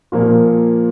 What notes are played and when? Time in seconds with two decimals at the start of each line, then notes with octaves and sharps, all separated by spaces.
0.12 A#2 F3 A#3 F4